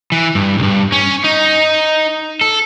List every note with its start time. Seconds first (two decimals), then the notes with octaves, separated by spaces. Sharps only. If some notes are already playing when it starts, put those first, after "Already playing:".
0.12 E3
0.35 G2
0.58 B1 G2
0.92 C#4
1.24 D#4
2.41 A4